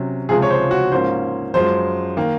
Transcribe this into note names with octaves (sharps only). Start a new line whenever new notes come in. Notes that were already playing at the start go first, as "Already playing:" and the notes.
Already playing: C3 F#3 C#4
C#2 C3 F3 G#3 G#4
C#5
C5
F#4
G#2 F3 A#3 C#4 C5
F#2 F3 G#3 C5
D#3 A#3